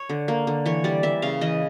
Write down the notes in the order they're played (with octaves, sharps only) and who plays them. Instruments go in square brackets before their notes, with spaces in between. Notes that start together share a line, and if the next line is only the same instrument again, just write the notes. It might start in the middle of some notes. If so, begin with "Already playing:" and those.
Already playing: [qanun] C#5
D3
A#3
D3
E3 C#5
G3 D5
E3 E5
C#3 F5
E3 D#5